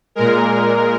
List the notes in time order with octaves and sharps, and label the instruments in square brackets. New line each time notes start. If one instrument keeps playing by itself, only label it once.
[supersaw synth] A#2 G#3 A#4